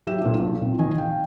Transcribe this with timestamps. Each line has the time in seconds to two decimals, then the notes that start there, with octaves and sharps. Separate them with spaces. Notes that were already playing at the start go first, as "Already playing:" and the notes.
0.07 F#3 G4 E5 E7
0.21 A#2 A3 B3 D4
0.40 B1
0.61 A#2 C4
0.78 A#1 D#3 D#5 G#5
0.98 F5 G5